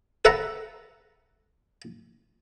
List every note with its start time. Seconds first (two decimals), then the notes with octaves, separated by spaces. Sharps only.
0.25 A4 B4 E5 F#5 A5 A#5